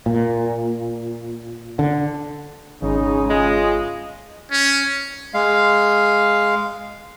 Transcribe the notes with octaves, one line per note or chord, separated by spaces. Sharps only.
A#2
D3
G#1 C#3 G#3 D#4
G#3 F4 G#4 D#5
C#4
G#3 F5